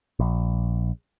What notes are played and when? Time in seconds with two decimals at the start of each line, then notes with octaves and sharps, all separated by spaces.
0.19 A#1